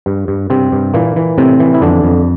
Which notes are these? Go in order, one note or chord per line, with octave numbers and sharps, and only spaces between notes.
G2
G2
G2 C3 C4
G2
A#2 E3 A#3
E3
A2 C3 C4
E3
E4
F2 D3 D4
F2